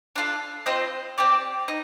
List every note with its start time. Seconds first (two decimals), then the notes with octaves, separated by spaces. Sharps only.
0.16 D4 F4 A4
0.66 C4 F4 C5 D#5
1.18 C4 G4 D5
1.68 D#4